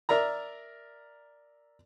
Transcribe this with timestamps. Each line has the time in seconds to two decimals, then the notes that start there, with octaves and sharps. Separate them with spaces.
0.09 A#4 D5 E5 A#5